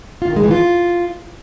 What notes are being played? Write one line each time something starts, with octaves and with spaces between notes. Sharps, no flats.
F4
D#3
G#3
E3
F4